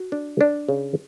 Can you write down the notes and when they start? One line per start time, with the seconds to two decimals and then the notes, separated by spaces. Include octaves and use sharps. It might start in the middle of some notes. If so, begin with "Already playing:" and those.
Already playing: F#4
0.12 D4
0.41 D4
0.69 C#3